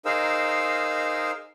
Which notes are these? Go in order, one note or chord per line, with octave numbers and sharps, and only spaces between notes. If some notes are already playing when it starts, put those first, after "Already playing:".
D#4 G#4 A#4 C5 F5 E6